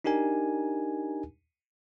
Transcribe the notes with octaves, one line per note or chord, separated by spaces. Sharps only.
D4 D#4 G4 A#4 G#5